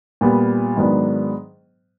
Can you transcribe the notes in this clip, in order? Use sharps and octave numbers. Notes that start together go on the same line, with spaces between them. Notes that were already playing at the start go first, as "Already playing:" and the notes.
A#2 G3 B3
G#2 D#3 F#3 B3 D4